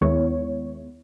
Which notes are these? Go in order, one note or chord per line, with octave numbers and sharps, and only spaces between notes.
D#2 D#3 G#3 B3 E4 C#5